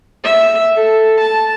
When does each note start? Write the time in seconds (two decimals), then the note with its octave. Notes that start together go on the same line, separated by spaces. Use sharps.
0.24 E5
0.76 A4
1.21 A5